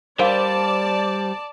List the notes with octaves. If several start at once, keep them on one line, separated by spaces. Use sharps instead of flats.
G3 D4 A#4 C5 D5 F5 A5